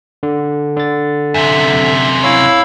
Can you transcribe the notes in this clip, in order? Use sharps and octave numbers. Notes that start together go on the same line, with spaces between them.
D3
D3 A6
F#2 C3 E5
E4 C#5 F5 E6